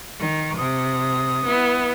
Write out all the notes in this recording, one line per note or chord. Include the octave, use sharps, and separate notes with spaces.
D#3
C3 D#6
B3 E4